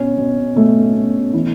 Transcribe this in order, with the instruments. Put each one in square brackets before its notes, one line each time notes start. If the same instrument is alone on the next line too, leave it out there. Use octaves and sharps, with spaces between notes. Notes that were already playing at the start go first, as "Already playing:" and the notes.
Already playing: [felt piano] B2 C#4
B2
B2 A3
B2
E3